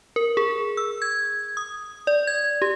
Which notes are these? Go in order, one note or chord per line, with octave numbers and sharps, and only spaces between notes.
A#4
G#4
E6
G#6
D#6
D5
G#6
G4